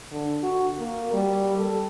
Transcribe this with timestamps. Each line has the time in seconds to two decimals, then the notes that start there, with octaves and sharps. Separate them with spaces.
0.12 D3
0.43 F#4
0.78 A#3
1.13 G3
1.58 A4